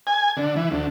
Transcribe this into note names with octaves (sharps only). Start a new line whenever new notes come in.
G#5
D3
E3
D2